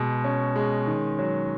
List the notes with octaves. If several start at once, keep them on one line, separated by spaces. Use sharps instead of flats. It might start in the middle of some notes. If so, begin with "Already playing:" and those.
Already playing: B2 G#3
C#4
G#3
D#3
F#3